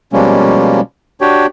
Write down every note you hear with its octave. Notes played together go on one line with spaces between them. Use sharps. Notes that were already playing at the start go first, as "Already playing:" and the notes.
B2 F3 G3 G#3 A#3 C#4
D4 F#4 G4 C#5 G5